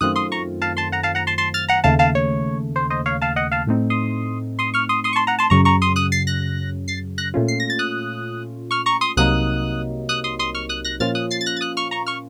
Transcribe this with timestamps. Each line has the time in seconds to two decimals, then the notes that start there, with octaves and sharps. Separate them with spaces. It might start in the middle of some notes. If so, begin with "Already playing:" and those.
0.01 F#2 D#3 A3 C4 F4 D#6 F#6
0.16 C6 D#6
0.32 A#5 C#6
0.62 F5 A5
0.77 A5 C6
0.92 F#5 A#5
1.03 F5 A5
1.15 F#5 A#5
1.27 A5 C6
1.38 A5 C6
1.54 F6 A6
1.68 F#5 A#5
1.84 D#2 C#3 A3 F5 A5
1.99 F5 A5
2.15 C#5
2.76 C5
2.90 C5 D#5
3.06 C#5 F5
3.22 F5 A5
3.36 D#5 F#5
3.51 F5 A5
3.67 A2 A3 C4 D#4
3.90 C6 D#6
4.59 C6 D#6
4.74 C#6 F6
4.89 C6 D#6
5.04 C6 D#6
5.13 C#6
5.16 A5 C6
5.27 F#5 A#5
5.39 A5 C6
5.50 F#2 C#3 F#3 A#5 C#6
5.65 A#5 C#6
5.82 C6 D#6
5.96 D#6 F#6
6.12 A6 C7
6.27 F#6 A#6
6.88 A6 C7
7.18 F#6 A#6
7.34 A#2 A3 C#4 F4
7.48 C7
7.60 A#6
7.70 A6
7.79 D#6 F#6
8.71 C#6 F6
8.86 A#5 C#6
9.01 C6 D#6
9.16 C2 C3 F#3 A#3 D#4 D#6 F#6
10.09 D#6 F#6
10.24 C6 D#6
10.39 C6 D#6
10.55 C#6 F6
10.69 D#6 F#6
10.85 F#6 A#6
11.00 A#2 F3 A#3 C#4 F4 F6 A6
11.15 D#6 F#6
11.31 A6 C7
11.41 A6
11.46 F#6 A#6
11.57 A6
11.61 D#6 F#6
11.77 C#6 F6
11.91 A#5 C#6
12.07 C#6 F6